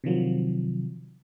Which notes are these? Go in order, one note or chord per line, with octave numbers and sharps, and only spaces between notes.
C3 D#3 F3 F#3